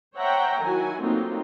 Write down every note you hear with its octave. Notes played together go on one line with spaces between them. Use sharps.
C5 C#5 E5 F#5 G5 A#5
D#3 F#3 E4 F#4 G#5
F#3 A3 A#3 C4 D#4 F4